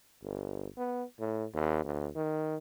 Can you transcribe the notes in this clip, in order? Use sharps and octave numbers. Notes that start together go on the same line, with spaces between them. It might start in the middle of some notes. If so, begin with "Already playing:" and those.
G1
B3
A2
D#2
D2
D#3